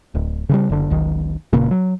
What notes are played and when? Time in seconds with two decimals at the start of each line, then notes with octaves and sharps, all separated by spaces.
0.15 D1
0.49 C#3 E3 G3
0.69 F#1 D3
0.90 E1 B1 D#3
1.53 E1 A#2 C#3 A#3
1.71 F#3